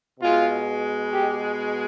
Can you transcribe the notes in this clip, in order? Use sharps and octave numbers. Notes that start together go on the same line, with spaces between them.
B2 G#3 F4
G4